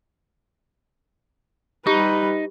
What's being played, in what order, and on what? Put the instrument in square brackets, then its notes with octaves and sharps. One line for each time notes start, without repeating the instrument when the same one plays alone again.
[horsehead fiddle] G3 B4 [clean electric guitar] D#4 [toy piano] G4